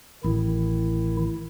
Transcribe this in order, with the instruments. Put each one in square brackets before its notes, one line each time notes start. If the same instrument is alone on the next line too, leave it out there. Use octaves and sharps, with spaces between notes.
[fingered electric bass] A1 [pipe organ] D#3 E4